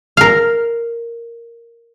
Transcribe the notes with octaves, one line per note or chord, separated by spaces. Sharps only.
A#4 F5